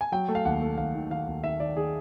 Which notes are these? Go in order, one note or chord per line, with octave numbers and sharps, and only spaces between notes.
G#5
F#3 G5
A3
F5
D#2 F#5
A3
D#2 F5
D#3
D#3 F5
D#2
D#3 E5
D#3 D5
D#3 G#4